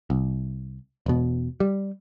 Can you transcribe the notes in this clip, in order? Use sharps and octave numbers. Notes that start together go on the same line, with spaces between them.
C2
E1 B2
G3